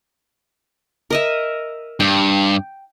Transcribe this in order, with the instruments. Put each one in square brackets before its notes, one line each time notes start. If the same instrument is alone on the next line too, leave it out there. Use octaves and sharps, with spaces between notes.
[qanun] A#4 D#5 E5
[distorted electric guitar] G2 [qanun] G5